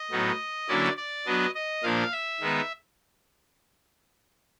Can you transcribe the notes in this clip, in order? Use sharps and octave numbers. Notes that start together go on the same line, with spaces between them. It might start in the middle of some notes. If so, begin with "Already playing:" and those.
Already playing: D#5
A2 F#3 B3 D#4
D3 F#3 A#3 C#4 E4 D5
D5
F#3 B3 D4 D#5
D#5
A#2 F3 A#3 D4 F5
E5
D#3 G#3 B3 D#4